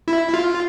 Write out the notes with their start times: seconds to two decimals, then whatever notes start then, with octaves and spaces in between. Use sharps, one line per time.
0.08 E4
0.34 F4